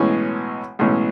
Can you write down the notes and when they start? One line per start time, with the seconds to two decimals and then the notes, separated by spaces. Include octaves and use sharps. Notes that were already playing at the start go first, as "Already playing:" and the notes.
Already playing: B1 A2 E3 G#3 C#4
0.79 B1 A2 E3 G#3 C#4